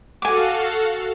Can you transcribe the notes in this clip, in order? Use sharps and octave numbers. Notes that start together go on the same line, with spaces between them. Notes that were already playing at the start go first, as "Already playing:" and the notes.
F#4 A4 F5 G#5 D6